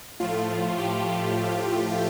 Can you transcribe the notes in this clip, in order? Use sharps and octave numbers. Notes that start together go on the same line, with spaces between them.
A2 F3 A3 F4
F4
G4